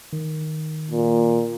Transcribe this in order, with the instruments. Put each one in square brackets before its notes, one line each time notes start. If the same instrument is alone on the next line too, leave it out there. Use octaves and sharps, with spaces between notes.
[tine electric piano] D#3
[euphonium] A#2